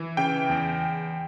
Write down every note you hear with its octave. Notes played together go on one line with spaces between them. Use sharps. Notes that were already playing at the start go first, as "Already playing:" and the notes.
Already playing: E3
C#3 G5
E2